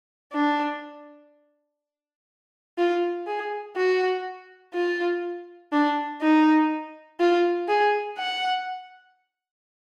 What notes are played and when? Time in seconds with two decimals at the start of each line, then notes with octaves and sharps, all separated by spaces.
0.33 D4
2.78 F4
3.27 G#4
3.76 F#4
4.74 F4
5.73 D4
6.22 D#4
7.20 F4
7.68 G#4
8.18 F#5